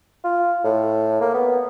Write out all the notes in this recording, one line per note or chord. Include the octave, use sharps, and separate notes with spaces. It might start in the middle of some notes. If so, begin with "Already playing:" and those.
F4
A2
A#3
B3